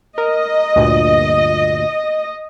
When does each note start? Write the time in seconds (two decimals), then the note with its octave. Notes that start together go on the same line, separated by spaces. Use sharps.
0.18 A#4 D#5
0.76 D2 G2 A#2